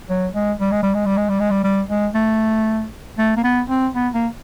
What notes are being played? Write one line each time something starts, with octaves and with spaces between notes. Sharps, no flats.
F#3
G#3
G3
G#3
G3
G#3
G3
G#3
G3
G#3
G3
G3
G#3
A3
A3
A#3
B3
C4
B3
A#3